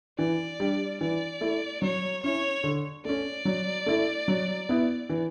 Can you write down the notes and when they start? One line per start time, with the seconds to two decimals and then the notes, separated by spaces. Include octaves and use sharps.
0.19 E3 D5
0.60 G3 D4
1.01 E3 D5
1.41 A3 E4
1.82 F#3 C#5
2.23 C#4 E4 C#5
2.64 D3
3.05 A3 C#4 D5
3.45 F#3
3.86 A3 E4
4.28 F#3
4.69 B3 E4
5.09 E3